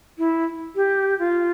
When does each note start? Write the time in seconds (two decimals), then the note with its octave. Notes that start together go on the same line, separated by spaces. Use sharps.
0.18 E4
0.76 G4
1.19 F4